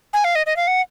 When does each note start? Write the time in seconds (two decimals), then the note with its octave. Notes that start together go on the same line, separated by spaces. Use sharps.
0.13 G#5
0.24 F5
0.35 D#5
0.46 D#5
0.56 F5
0.67 F#5